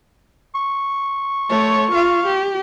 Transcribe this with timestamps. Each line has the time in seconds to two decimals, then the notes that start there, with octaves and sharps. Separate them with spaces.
0.55 C#6
1.50 A3 C#5
1.91 F4 F5
2.26 G4